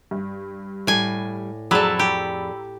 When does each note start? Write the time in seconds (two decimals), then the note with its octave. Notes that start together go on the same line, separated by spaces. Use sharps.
0.11 G2
0.87 A2 G3 G#5
1.71 F2 F#3 G#4 A4 D5 A#5 B5 E6
1.99 G4